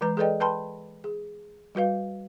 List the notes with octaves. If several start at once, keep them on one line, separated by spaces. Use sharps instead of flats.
E3 G#3 B4 A#5
G#4 A4 B4 D5 D#5 G5
B4 G5 A5 B5 C6
G#4
G3 F#4 B4 F5